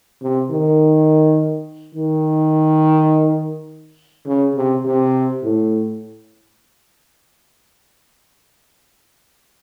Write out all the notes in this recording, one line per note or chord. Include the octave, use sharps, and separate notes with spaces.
C3
D#3
D#3
C#3
C3
C3
A2